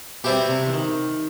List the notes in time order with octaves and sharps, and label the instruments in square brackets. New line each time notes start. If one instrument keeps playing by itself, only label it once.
[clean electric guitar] B2 [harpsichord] G3 C4 E4 G4
[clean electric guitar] C3
E3
D#3